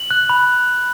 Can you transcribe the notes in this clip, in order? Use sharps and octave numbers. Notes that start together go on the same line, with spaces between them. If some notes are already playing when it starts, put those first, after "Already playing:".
Already playing: F#7
F#6
B5